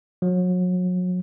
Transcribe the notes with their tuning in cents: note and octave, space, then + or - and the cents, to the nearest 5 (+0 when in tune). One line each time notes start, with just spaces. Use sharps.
F#3 -35